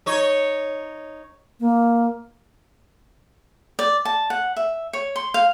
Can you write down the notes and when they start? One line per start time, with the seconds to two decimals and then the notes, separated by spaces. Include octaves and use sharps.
0.06 D#4 C#5
1.60 A#3
3.79 D5
4.05 A5
4.30 F#5
4.57 E5
4.93 C#5
5.16 C6
5.34 F5